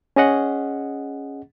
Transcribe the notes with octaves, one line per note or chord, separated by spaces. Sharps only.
C#4 G#4 D#5 F#5